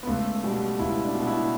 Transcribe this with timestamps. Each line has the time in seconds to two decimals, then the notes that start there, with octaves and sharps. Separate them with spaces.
0.03 B3
0.07 C#2 A3
0.44 B2 G3
0.79 C#2 E4
1.04 D4
1.15 B2
1.27 E4